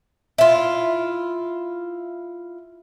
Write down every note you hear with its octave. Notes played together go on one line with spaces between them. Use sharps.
E4 F4